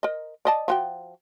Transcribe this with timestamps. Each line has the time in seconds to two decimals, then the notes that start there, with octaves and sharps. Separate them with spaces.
0.03 A#4 D#5
0.45 D5 D#5 A5
0.68 F3 F#4 G5